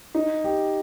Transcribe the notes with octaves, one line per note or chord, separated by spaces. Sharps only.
D#4
G4